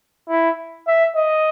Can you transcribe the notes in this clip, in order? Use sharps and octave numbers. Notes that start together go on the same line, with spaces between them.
E4
E5
D#5